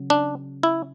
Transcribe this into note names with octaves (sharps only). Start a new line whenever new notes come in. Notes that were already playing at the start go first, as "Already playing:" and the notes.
Already playing: C#3 F#3
D4
E4